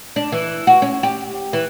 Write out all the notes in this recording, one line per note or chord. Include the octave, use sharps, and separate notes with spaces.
D4
E3
F#4
C#4
G4
E3